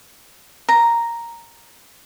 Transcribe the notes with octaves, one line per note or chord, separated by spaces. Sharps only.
A#5